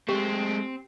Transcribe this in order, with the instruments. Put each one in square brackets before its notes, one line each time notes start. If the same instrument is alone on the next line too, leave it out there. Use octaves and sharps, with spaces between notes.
[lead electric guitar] G#3 A3 [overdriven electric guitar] C4 [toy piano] G4